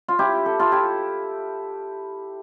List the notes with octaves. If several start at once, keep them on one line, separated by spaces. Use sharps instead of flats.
F4
E4 G4
A4
F4 A4
E4 G4